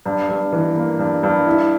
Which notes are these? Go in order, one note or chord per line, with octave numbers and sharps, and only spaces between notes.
G2
G2
E3
A#3
G2
G2
E4